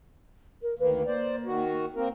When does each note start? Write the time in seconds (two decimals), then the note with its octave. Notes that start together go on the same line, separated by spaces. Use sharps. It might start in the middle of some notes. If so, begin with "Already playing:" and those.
0.62 A#4
0.79 D2 D#3 A#3 B4
1.07 A#3 C5 D5
1.46 D#3 F#4
1.96 A#3 C4 A#4